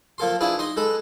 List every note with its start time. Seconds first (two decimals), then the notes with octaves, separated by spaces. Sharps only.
0.18 F3 A#3 A4 C6
0.41 D4 E4 F4 G#4 B4
0.59 D#4 D#5 C6
0.77 G#3 A4 B4